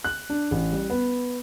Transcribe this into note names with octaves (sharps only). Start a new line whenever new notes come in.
F#6
D4
A1
G3
B3